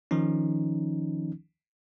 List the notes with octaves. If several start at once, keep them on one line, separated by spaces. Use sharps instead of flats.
D#3 F3 C#4 D#4